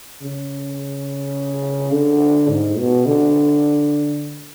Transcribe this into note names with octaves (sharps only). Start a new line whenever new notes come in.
C#3
D3
G#2
B2
D3